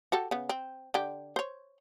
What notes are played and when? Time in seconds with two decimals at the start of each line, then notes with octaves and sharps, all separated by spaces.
0.12 F#4 G4 A4
0.31 C#3 B3
0.49 C4
0.94 D3 G4
1.36 C5 C#5